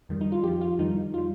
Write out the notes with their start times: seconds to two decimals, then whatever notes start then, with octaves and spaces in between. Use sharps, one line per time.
0.09 F2 D#3 G3
0.21 D#4
0.32 F4
0.43 F2 G4
0.47 F3
0.61 F4
0.79 F2 D#3 G3 D#4
1.14 F4
1.18 G3